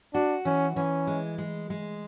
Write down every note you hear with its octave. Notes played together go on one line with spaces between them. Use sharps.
D4 F#4
E3 C#4
E3 C#4
G#3
G#3
G#3